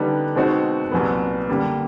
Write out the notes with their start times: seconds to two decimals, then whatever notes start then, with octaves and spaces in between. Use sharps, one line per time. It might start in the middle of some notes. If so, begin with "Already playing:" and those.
Already playing: D3 G3 B3 D#4
0.35 B2 G#3 C4 D#4 F#4
0.91 C2 A#2 F#3 B3
1.48 D3 G3 A#3